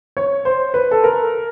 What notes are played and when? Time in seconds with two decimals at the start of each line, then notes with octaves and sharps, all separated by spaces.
0.17 C#5
0.45 C5
0.74 B4
0.91 A4
1.04 A#4